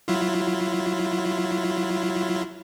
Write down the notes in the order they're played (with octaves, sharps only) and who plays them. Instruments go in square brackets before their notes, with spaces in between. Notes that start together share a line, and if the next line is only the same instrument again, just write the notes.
[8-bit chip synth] F#3 E4 F4